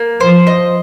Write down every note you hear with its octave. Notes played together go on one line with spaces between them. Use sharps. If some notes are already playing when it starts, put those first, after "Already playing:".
Already playing: A#3
F3 C5
D#5